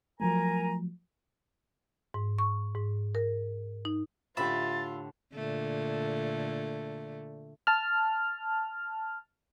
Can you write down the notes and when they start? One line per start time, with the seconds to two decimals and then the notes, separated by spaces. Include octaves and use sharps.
0.20 F3 F#3 A3 A#4 G#5 A#5
2.14 G#2
2.39 C#6
2.75 G#2
3.15 A#4
3.85 D#4
4.37 A2 D3 F4 G4 E5 B5 A6
5.35 A#2 D3 A3
7.67 A5 F6